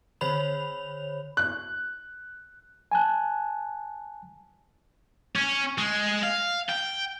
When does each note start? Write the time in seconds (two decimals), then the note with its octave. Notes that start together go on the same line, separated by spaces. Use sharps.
0.21 D3 C5 C#5 B5 F7
1.37 F#6
2.92 G#5 A5 F#6
5.36 C#4
5.78 G#3
6.23 F5
6.69 G5